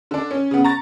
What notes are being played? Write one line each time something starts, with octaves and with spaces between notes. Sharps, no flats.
D3 D4
C#4
C#3 B3
A#5 C#6 A6